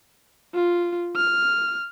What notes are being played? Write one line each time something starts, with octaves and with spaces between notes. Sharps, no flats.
F4
F6